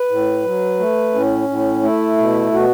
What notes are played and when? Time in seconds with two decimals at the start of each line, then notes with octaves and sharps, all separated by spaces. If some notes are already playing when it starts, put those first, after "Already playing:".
Already playing: B4
0.10 A2
0.45 F#3
0.79 A3
1.14 A2 C#4
1.48 A2
1.83 A3 E4
2.18 B2
2.52 B2 F#4